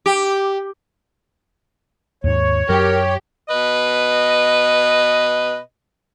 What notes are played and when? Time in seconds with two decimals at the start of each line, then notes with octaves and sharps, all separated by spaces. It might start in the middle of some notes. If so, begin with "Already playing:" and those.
0.06 G4
2.24 D#2 G#2 C#5
2.69 F#2 F#3 G4 A#4
3.49 B2 B4 D#5